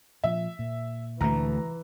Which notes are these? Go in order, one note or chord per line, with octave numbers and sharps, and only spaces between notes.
A#2 F3 E5
A#2
D2 E3 A3 A#5